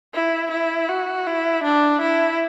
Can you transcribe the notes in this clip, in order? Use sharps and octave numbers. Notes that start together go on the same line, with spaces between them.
E4
E4
F#4
E4
D4
E4